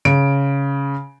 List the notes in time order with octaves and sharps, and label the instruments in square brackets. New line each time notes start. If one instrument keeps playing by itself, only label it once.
[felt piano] C#3 D7